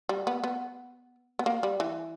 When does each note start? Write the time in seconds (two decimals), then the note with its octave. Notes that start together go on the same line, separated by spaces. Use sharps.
0.09 G3
0.27 B3
0.44 B3
1.39 B3
1.46 A#3
1.63 G3
1.80 E3